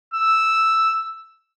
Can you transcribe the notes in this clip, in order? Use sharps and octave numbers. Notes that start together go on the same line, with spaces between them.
E6